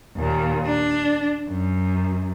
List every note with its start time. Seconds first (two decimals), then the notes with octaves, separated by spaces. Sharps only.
0.16 D#2 A#2
0.66 D4
1.49 F#2